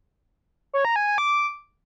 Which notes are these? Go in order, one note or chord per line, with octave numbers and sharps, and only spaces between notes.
C#5
A#5
G#5
G#5
D6